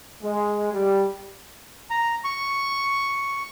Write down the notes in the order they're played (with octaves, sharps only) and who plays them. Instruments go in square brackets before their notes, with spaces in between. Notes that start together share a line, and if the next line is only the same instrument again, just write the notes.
[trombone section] G#3
G3
[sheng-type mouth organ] A#5
C#6